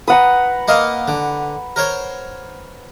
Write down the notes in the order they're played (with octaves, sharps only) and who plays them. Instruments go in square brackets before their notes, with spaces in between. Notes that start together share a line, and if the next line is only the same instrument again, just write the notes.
[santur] B4 F#5 A#5 [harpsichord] D#6
[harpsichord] A#3 D#5 F5
D3
A#4 C5 C#5